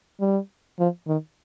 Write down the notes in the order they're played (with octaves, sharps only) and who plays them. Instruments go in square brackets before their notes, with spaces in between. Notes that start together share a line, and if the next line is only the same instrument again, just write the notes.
[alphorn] G3
F3
D#3